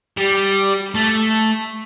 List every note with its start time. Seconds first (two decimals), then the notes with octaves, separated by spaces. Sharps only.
0.17 G3
0.95 A3